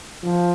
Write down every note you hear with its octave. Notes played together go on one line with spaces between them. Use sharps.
F3